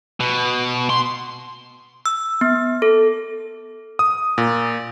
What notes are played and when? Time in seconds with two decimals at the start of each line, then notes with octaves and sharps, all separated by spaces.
0.20 B2
0.90 C6
2.06 E6
2.41 B3
2.82 A4
3.99 D#6
4.38 A#2